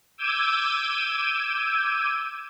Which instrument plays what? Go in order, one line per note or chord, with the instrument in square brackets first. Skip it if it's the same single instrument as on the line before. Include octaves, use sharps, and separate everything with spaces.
[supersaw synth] D6 E6 G6 G#6 D#7